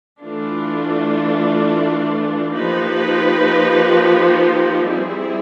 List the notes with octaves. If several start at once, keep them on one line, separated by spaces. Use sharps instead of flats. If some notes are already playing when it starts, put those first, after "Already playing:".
E3 A3 D4 F4
F3 A#3 D#4 G4 B4
G3 C4 E4 G#4